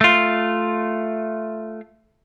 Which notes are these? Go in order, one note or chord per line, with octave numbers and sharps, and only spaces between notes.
A3 F4